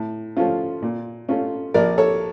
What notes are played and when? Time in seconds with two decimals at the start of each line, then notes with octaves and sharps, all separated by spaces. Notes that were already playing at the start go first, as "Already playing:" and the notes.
Already playing: A2
0.36 F3 A3 C#4 F4
0.82 A#2
1.29 A3 C#4 F4
1.74 A#1 A#4 D5
1.98 A4 C#5